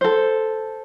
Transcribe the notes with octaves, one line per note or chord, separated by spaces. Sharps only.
A4 C5